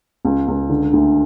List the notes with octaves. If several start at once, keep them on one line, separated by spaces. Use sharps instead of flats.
C#2
C#2
D3
D2